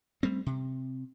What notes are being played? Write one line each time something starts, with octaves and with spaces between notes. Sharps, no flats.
G3 A3 C4
C3